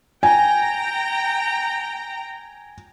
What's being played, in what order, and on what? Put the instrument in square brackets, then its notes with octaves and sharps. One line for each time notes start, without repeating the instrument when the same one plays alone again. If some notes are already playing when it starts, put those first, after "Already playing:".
[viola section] G5 A#5 [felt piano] G#5